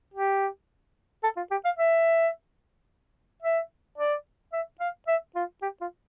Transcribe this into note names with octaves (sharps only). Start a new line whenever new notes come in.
G4
A4
F4
G4
F5
E5
E5
D5
E5
F5
E5
F4
G4
F4